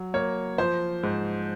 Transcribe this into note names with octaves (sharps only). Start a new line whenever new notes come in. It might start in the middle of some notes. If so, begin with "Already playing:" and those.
Already playing: F#3
A#3 C#5
F3 C5
G#2